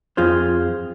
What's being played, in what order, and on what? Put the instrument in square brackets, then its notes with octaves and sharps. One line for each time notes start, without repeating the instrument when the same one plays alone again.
[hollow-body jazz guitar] F2 F4 G#4 C5